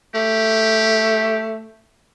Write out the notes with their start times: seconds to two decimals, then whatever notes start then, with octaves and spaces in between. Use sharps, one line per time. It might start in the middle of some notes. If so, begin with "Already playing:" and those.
0.15 A3 G4